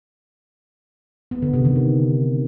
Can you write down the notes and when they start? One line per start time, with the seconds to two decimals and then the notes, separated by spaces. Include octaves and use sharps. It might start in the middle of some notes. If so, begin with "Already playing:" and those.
1.31 B3
1.42 D3
1.53 C3
1.65 D#3
1.76 D3